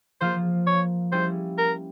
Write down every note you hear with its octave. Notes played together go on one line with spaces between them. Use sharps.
F3 A#3 F4 C5
C#5
G3 C#4 E4 C5
A#4